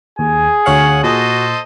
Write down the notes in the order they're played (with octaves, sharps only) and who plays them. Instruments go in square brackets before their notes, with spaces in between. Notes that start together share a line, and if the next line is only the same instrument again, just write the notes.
[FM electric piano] D#2 [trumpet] G#4 [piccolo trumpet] G#5
[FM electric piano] D2 C#5 F5 [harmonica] F#5
[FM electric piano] A#2 [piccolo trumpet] F#4 [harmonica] A4 C5 D#5